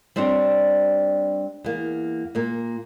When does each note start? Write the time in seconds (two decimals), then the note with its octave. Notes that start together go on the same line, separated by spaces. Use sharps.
0.16 G3 C4 D4 C5 C#5
1.64 E2 A#3
2.35 A#2 A#3